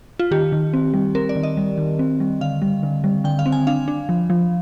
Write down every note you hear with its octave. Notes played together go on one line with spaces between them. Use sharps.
F4
D#3 G4
D#3
C4
G3
C4 A#4
D5
D#3
D#5
G3
D#3
C4
G3
D3 F5
G3
D3
G3
D3 G5
F5
C4
G#5
D4 F5
D4
F3
F3